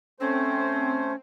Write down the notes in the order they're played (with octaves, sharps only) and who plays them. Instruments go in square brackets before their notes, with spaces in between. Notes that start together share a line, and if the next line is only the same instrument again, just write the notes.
[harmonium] A3 C5 [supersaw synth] C4 [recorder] C#4